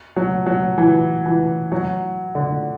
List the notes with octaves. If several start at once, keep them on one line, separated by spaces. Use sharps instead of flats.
F#3
F#3
E3
E3
F#3
D3